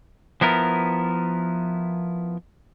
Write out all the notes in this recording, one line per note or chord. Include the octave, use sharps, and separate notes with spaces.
F3 B3 E4 A#4